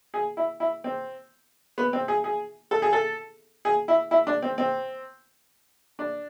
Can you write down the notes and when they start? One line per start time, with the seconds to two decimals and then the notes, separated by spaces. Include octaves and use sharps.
0.14 G#4
0.37 E4
0.60 E4
0.84 C4
1.78 B3
1.93 C4
2.08 G#4
2.24 G#4
2.71 A4
2.82 G#4
2.93 A4
3.65 G#4
3.88 E4
4.11 E4
4.27 D4
4.42 C4
4.58 C4
5.99 D4